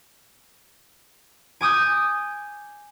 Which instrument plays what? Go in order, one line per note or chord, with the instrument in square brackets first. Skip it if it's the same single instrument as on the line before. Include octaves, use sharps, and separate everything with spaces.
[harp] G#5 D6 D#6 G6